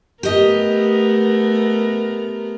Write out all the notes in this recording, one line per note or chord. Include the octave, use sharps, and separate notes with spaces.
A3 B3 G4 A#4 D#5